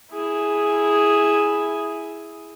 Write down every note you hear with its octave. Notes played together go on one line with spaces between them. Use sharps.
E4 G#4